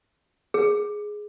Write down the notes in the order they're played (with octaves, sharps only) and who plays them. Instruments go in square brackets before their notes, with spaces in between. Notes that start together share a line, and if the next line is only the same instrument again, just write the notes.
[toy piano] G#4